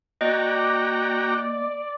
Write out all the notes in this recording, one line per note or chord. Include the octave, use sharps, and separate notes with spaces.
A#3 F#4 D5 D#5 G5 A#5